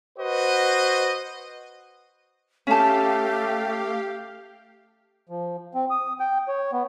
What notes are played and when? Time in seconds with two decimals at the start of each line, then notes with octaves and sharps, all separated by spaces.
0.18 F#4 B4 C5 D#5
2.67 A3 C#4 G4 F5 A5
5.29 F3
5.74 C4
5.90 D#6
6.20 G5
6.48 C#5
6.73 B3